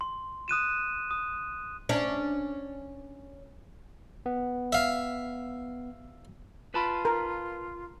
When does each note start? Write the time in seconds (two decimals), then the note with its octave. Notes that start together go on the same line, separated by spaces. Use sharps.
0.01 C6
0.48 D#6 F#6 D#7 E7
1.11 D#6
1.89 C#4 D4
4.26 B3
4.73 E5 F5
6.74 F4 B4 A5 B5
7.05 A#4